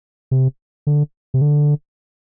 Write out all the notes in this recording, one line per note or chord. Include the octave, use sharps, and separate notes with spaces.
C3
D3
C3
D3